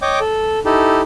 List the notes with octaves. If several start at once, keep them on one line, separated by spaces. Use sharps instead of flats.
C#5 D#5 G5 D6
A4
D#4 E4 G4 A4